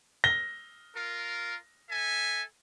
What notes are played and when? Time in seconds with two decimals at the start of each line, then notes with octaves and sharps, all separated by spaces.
0.24 A#6 G7
0.94 F4 A#4
1.89 A4 E5 G#5